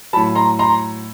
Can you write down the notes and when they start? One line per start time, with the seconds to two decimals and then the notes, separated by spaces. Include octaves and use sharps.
0.13 F#3 A5 B5
0.16 A2
0.35 A#5 C6
0.59 A#5 C6